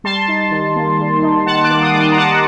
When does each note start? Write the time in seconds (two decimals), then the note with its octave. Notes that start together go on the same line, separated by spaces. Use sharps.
0.04 G3 A5 C6
0.28 D#4
0.51 D#3
0.76 A#3
0.99 G3
1.23 D#4
1.46 D#3 F#5 A5
1.64 D6 F#6
1.70 A#3
1.82 C6 D#6
1.94 G3 D6
2.00 A5 C6
2.12 A#5
2.18 D#4 F#5 A5